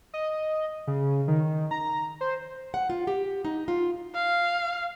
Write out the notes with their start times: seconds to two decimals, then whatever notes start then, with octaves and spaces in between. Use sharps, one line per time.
0.14 D#5
0.87 C#3
1.28 D#3
1.71 A#5
2.21 C5
2.74 F#5
2.90 F4
3.07 G4
3.45 D#4
3.68 F4
4.15 F5